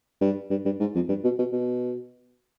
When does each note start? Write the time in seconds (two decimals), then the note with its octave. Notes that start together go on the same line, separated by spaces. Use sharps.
0.21 G2
0.50 G2
0.65 G2
0.80 G#2
0.95 F2
1.09 G2
1.24 B2
1.39 B2
1.53 B2